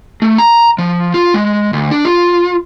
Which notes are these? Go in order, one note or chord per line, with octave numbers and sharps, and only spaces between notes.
A3
A#5
F3
F4
G#3
D2
D4
F4